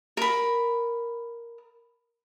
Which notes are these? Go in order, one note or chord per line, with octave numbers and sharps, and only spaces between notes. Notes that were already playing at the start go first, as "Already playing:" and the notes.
A#4 B5